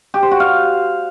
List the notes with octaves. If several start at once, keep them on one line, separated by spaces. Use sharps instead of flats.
G4
C5
F#4
F5